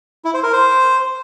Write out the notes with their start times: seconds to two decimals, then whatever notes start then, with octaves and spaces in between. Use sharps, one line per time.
0.25 E4
0.34 C5
0.43 A#4
0.52 C5